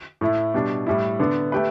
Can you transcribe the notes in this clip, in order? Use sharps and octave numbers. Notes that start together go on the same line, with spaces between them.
A2 A3 E4
B2 G3 D4
A2 G3 E4
D3 B3 D4
A3 G4 B4